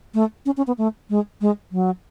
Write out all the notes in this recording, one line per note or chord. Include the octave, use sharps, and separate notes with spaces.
A3
C#4
C#4
B3
A3
G#3
G#3
F#3